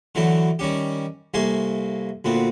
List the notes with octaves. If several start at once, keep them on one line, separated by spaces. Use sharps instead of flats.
D3 E3 F#3 A3 E4
D#3 G3 C#4 G4
C2 A3 A#3 G#5 C6
D2 A#2 B3 C4